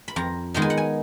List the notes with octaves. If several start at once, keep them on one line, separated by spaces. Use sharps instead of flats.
B5
F2 A#5
D#3 G#3 B3 D#4 A#5
G#5
F#5
G#5